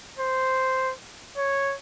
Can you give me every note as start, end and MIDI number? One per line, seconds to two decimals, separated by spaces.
0.19 0.93 72
1.37 1.75 73